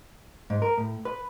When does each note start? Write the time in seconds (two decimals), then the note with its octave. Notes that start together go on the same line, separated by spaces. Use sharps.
0.50 G#2
0.62 A#4
0.78 A2
1.05 B4